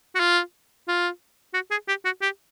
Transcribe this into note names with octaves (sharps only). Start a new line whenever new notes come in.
F#4
F4
F4
F#4
G#4
G4
F#4
G4